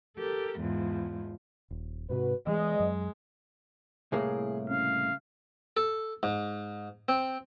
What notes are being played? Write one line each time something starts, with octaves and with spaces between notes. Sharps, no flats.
G4 A4 A#4
E2 G#2 F3
D#1
G#2 C3 F#4 B4
E2 E3 G#3 D#5
F#2 F#3
C2 A2 A#3 G#4
C#3 F5
A4
G#2
C4